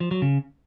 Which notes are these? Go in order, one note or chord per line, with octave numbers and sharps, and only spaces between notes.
F3
F#3
C#3